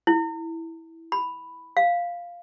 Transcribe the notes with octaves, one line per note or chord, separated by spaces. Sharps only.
E4
B5
F5